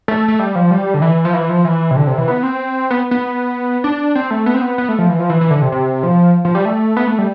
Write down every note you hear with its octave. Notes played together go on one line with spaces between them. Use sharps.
A3
A3
G3
F3
G3
D3
E3
F3
E3
F3
E3
C3
D3
C3
E3
B3
C4
B3
B3
D4
C4
A3
B3
C4
B3
B3
A3
F3
E3
F3
E3
E3
D3
C3
C3
F3
F3
G3
A3
B3
A3
G3